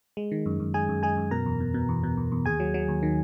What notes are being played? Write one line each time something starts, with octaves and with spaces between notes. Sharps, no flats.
G#3
D#3
F#2
F#2
G#3 G#4 G#5
F#2
G#3 G#4 G#5
F#2
B2 A#4 A#5
E2
B2
B2
E2
B2
E2
E2
D#2 G#4 G#5
F#3
F#3
D#2
D#3